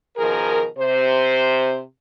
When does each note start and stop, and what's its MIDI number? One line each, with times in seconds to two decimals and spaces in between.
0.17 0.65 47
0.17 0.65 51
0.17 0.65 53
0.17 0.65 68
0.17 0.65 70
0.79 1.79 48
0.79 1.79 72